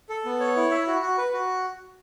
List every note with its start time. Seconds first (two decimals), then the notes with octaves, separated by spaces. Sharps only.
0.09 A4
0.25 B3
0.40 C#5
0.56 E4
0.71 E5
0.87 F#4
1.02 F#4
1.18 B4
1.33 F#4